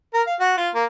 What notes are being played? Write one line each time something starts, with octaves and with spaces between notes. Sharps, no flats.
A#4
F5
F#4
F4
A#3